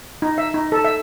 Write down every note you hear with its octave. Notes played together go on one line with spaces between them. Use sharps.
D#4
E5
D#4
A4
E5